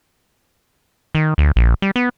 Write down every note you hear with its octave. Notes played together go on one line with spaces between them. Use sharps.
D#3
D2
A#1
G3
B3